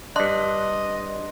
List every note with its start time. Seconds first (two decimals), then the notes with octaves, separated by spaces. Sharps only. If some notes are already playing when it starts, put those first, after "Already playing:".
0.16 G2 D4 D#5 C6 F#6